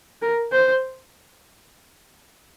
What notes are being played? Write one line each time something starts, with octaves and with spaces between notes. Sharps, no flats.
A#4
C5